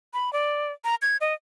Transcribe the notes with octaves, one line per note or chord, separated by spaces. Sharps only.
B5
D5
A#5
G#6
D#5